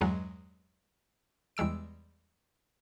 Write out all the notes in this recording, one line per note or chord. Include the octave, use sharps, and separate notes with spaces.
E2 G2 F#3 G#3
E2 G3 G#3 E6 D7